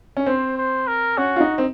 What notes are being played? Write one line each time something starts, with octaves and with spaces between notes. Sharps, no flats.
C#4
C4 C5
C5
A#4
C#4 F#4
F4
D#4
C4